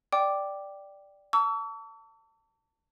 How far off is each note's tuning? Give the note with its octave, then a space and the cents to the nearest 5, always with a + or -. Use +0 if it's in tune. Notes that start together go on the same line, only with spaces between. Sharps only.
D5 +0 G5 -5 D6 +0
A5 +30 C#6 +45 E6 +0